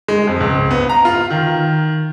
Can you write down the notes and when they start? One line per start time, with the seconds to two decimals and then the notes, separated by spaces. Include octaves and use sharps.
0.08 G#3
0.27 F2
0.41 C#2
0.71 B3
0.90 A#5
1.05 F4
1.30 D#3